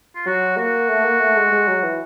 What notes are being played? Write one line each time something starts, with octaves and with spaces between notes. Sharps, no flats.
F4
F#3 F#4
A#3 F#4
A3
A#3
A3
G#3
G#3
F#3
E3